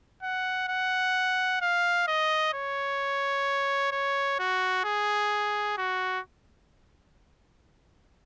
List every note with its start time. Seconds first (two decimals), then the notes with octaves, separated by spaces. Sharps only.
0.23 F#5
0.69 F#5
1.62 F5
2.08 D#5
2.54 C#5
3.92 C#5
4.39 F#4
4.85 G#4
5.78 F#4